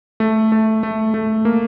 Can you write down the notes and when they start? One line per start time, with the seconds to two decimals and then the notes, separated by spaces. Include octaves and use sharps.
0.20 A3
0.52 A3
0.83 A3
1.14 A3
1.45 A#3